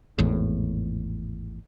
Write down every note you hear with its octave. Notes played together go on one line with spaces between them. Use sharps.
G#1 E2 A2